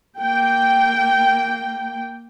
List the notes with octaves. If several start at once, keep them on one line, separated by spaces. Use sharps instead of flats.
A#3 G5